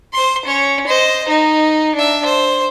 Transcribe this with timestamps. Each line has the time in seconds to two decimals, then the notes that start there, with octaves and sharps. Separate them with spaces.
0.14 C5 C6
0.45 C#4 C#5
0.87 C5 D#5
1.28 D#4
1.95 D4 E5
2.25 C5